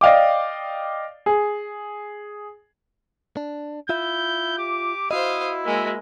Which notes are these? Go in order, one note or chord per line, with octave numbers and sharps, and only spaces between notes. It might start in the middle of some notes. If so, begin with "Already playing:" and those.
D5 D#5 F5 G5 D6
G#4
D4
E4 F4 E5 G6
G4 D6
E4 F#4 C5 D#5 F5 D#6
G#3 A#3 E5